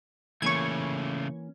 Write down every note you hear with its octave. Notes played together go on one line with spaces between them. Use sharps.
C#3 E3 A3 A#3 C#4 C#6 G#6